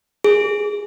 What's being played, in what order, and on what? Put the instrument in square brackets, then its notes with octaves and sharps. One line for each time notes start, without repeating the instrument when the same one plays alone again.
[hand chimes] G#4